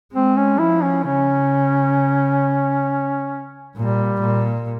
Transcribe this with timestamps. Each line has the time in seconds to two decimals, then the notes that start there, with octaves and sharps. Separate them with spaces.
0.13 G#3 C4
0.37 C#4
0.59 F3 E4
0.82 C#4
1.04 C#3 C#4
3.76 A#2 G3
4.21 A#2